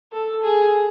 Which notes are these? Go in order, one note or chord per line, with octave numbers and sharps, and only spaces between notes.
A4
G#4